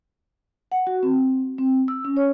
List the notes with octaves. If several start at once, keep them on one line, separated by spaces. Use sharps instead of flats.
F#5
F#4
C4
C4
E6
C#4
C#5